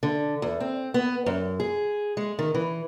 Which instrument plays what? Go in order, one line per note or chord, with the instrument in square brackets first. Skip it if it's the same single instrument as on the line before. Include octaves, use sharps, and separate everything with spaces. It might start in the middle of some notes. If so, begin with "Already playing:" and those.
[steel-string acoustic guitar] D3
E2
C4
B3
F#2
G#4
G#3
D#3
E3